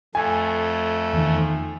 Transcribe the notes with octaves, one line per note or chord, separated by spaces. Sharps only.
F2 A3 G#5
E2 D#3